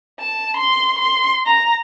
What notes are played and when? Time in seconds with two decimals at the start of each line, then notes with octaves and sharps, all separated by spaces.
0.19 A5
0.56 C6
0.99 C6
1.45 A#5